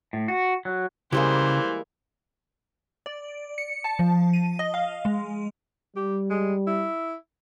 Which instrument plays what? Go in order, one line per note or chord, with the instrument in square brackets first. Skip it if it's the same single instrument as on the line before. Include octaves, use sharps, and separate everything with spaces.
[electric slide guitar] A2
F#4
F#3
[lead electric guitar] C#3 [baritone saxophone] E3 [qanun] G3 G#3 A#3 [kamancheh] C5
[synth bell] D5
C#7
A5
F3
D#7
D#5
F5
G#3
[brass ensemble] G3 [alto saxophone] G4
[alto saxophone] G#3
E4